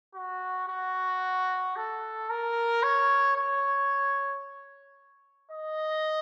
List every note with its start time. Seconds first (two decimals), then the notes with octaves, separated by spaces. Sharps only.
0.15 F#4
0.69 F#4
1.76 A4
2.30 A#4
2.83 C#5
3.37 C#5
5.52 D#5